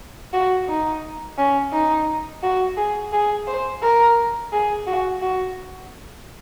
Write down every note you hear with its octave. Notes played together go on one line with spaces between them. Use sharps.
F#4
D#4
C#4
D#4
F#4
G#4
G#4
C5
A#4
G#4
F#4
F#4